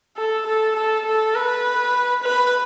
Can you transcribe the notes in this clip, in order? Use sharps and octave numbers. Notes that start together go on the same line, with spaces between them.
A4
A4
A4
A4
B4
B4